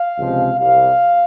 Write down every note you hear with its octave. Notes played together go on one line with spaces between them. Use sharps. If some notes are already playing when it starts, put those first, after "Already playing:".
Already playing: F5
C#2 C3 F3 G#3
C2 C3 G3 F5